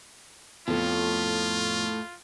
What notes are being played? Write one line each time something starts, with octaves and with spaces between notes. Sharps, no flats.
F2 A2 F3 B3 F4 A4